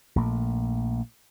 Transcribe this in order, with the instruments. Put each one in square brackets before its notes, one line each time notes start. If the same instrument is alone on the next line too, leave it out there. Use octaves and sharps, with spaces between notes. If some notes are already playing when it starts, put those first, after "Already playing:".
[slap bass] A#1 A#2 A3